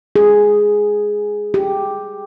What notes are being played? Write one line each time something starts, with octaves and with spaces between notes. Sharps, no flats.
G#4
G4